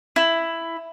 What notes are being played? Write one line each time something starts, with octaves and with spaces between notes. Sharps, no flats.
E4